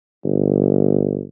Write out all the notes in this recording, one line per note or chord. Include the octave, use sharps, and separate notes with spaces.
G1